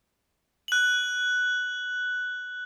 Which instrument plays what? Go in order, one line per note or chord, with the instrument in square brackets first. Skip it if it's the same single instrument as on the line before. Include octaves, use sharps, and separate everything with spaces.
[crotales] F#6 F#7